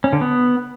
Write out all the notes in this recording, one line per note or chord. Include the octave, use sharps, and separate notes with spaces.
C#4
D3
B3